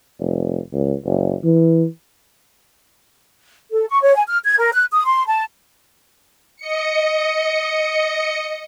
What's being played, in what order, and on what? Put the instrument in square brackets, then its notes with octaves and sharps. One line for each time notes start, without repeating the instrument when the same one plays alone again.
[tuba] F1
C#2
F#1
E3
[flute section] A4
C#6
C#5
G#5
F6
G#6
A#4
F#6
D#6
C6
A5
[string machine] D#5 C#7